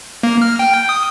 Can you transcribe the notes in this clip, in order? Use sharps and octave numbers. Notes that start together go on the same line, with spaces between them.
A#3
F6
G5
D#6